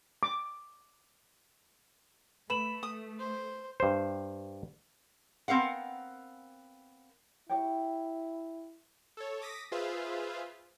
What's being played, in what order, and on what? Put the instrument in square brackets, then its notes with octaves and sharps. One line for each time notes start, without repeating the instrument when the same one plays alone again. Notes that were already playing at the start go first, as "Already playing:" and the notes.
[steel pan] D6
[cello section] A3 [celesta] B4 E7 F#7 [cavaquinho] B5
[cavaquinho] D#6
[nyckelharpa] C5
[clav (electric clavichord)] G2 C5
[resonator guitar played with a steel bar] B3 C4 A#4 F5 F#5
[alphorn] E4 [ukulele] G4 C#5 G5
[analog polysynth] A4 C#5
D6 D#6 A#6 B6
F4 G#4 B4 C5 E5 F5